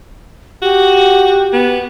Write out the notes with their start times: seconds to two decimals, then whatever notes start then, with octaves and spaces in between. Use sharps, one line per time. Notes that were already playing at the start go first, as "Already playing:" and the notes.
0.62 F#4 G4
1.53 B3